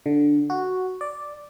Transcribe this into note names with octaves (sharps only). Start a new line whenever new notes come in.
D3
F#4
D5